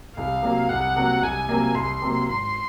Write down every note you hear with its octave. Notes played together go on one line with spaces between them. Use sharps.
C2 F5
C3 F#3 A#3
C2 F#5
C3 F#3 A#3
C2 G#5
C3 F#3 A#3
C2 C6
C3 F#3 A#3
G#1 C6